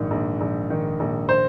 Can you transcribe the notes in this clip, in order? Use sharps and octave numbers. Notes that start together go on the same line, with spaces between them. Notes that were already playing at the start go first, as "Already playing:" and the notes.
Already playing: A#1 G#2 D#3
A#1
A#1
D#3
A#1
C5